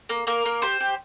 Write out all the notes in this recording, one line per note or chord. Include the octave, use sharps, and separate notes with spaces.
A#3
A#3 A#4
A#3
G4 C5
G4